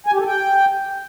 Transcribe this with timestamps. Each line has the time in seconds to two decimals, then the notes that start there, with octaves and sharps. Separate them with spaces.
0.07 G#5
0.13 G4
0.20 A4
0.26 G5